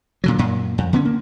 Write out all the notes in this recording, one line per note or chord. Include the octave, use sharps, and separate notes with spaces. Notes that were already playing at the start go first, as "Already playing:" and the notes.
A#2 D3 F#3
F#2 A#2
F2
D3 B3 C#4
A#3